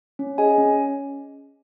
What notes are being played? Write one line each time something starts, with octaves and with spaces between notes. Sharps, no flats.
C#4
G#4 D#5 G#5
C#4